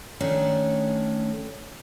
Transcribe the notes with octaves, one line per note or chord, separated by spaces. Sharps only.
D#3 A3 C#4 D4